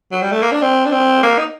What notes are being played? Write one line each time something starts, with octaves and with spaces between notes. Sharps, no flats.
F#3
G3
A3
A#3
D4
C4
D4
C4
A#3
D#4